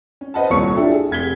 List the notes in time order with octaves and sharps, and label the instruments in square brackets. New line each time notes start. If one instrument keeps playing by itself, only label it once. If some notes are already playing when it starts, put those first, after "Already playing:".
[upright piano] C#4
B4 C5 D#5 F#5 A5
D#1 C2 A#2 C#5 C#6 C#7
D4 E4 F4 G4 A4
G#4
F1 G#6 B6 G7